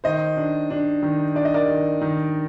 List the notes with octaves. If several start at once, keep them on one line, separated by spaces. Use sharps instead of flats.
D#3 C5 D#5
D4
D4
D#3
D4 D5
D#5
A#4 D5
D#3
D#3